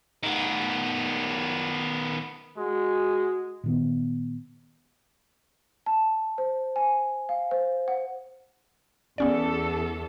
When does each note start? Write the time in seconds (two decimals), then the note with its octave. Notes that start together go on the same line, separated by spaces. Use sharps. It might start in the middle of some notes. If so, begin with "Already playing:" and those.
0.23 D#3 B3
2.57 G#3 F#4
3.64 A#2 D#3 B3
5.86 A5
6.38 C5
6.76 G#5
7.29 F5
7.51 C5
7.88 F#5
9.18 E2 B3 C#4 A4 D5